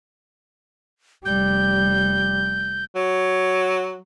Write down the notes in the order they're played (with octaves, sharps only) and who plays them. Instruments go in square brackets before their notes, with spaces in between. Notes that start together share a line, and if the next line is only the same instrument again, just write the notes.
[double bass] F1 G3 [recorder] G6
[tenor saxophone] F#3